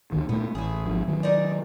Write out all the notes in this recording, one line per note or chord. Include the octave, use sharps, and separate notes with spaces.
D2 D3 D#3
A#2 A3 B3
A1 E4 G#4
G#1 F3
D#3 F#3
D#4 A#4 D5